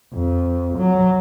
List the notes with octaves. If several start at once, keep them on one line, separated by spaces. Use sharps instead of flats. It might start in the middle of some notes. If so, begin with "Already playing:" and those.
F2
F#3